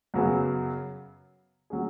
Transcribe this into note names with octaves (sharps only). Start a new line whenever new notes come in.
F#2 C#3 F#3 B3 G#4
F#3 C#4 G#4